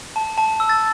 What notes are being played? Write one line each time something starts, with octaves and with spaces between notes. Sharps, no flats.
A5
A5
E6
A6